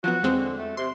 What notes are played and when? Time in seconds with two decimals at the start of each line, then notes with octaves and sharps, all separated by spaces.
0.04 F3 F#3 B3 F#4
0.23 E2 G#3 C4
0.37 D3
0.58 A3
0.77 C3 C6